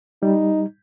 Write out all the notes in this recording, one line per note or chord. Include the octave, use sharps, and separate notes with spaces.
G3 D#4